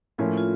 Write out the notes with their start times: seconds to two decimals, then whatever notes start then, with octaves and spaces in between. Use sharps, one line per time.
0.18 A2 F3 A#3 C#4 F4
0.37 F4